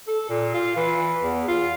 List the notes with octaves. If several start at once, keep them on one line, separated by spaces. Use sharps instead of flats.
A4
A#2
F4
E3
E2
F4